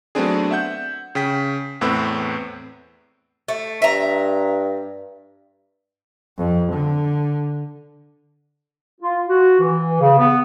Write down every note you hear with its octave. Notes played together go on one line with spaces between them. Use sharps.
F#3 A3 B3 C4 D4 G#4
E5 F#5 G6
C#3 G5 B6
E2 A2 C4 B4 E6
A3
G2 E5 A#5
F2
D3
F4
F#4
E3
C#3
B3